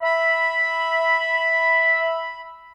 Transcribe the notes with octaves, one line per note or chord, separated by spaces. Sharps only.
E5 B5